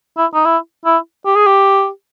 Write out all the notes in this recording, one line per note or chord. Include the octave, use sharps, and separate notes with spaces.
E4
D#4
E4
E4
G4
G#4
G4